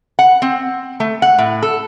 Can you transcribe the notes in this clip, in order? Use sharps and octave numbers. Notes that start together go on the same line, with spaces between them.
F#5
C4
A3
F#5
A2
A4